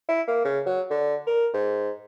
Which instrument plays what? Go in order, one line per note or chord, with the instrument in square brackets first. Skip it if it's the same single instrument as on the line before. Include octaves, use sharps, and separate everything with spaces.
[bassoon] E4
A#3
C#3
F#3
D3
A#4
G#2